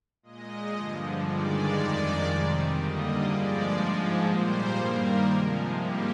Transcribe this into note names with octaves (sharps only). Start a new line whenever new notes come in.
A#2 G#3 D#5
G2 D3 F3
G2 D#3 G#3 D5
F2 D#3 G#3 D5
C3 D#3 G3
D#2 D3 G3 A#3 D#5
G2 F3 G#3 D5
G#2 F3 G#3
A#2 G3 A#3 C5
G2 D#3 G3 A#3 A#4
C3 F3 G#3
G#2 G3 A#3 G4